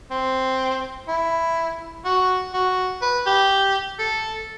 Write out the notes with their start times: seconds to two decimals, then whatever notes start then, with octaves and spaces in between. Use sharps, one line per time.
0.10 C4
1.08 E4
2.05 F#4
2.53 F#4
3.02 B4
3.26 G4
3.99 A4